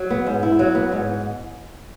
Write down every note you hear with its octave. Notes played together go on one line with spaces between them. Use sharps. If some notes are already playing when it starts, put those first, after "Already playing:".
Already playing: F#3
B3
G#2
E4
F#3
B3
G#2